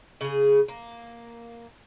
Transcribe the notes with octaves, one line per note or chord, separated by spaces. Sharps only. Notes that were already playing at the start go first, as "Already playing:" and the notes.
C#3 G#4
A#3